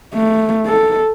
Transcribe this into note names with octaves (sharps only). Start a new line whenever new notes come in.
A3
A4